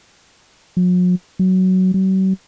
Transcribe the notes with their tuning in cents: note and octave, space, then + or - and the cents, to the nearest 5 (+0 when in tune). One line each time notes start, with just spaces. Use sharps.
F#3 -45
F#3 +10
F#3 +45